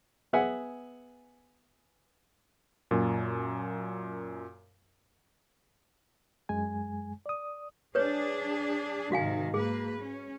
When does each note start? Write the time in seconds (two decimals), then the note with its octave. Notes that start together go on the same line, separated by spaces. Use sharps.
0.33 B3 G#4 E5 F#5 G#5
2.91 F#2 A#2
6.49 F#2 G#3 G#5
7.26 D5 D#6
7.95 D4 G#4 B4 C#5
9.12 G#2 C3 D#3 F#4 F5 G#5
9.54 A#3 G#4 B4
10.01 C#4